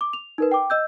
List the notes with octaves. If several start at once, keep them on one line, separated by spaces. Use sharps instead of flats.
D6
F7
D#4 A#4 B4
G5 D6
D#5 E6 G6